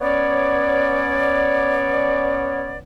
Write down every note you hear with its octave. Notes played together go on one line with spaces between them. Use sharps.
B3 C#4 C#5 D5